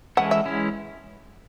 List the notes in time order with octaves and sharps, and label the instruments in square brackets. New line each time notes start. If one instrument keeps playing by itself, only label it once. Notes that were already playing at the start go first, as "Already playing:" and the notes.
[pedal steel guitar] E3 G#3 C#4 E4 A4 [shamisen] F#5
[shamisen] E5
[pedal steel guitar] E3 G#3 C#4 E4